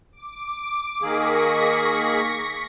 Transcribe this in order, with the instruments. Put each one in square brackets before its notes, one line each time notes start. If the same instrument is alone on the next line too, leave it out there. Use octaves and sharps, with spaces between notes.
[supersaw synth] D6
[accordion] D#3 A#3 G#4 [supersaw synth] C#6 A#6 B6